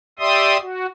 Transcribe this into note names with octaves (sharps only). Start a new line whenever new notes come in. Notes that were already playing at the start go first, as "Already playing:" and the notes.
G4 D5 E5 C6 D#6
F#4